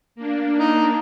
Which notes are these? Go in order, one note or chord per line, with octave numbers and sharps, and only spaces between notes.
A#3 D4
D#4